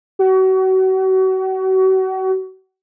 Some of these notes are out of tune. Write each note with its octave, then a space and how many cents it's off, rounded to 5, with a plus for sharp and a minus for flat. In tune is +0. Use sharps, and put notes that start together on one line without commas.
F#4 +35